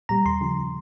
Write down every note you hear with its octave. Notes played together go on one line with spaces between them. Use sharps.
A#2 G3 A#5
D#2 C6
C#3 F3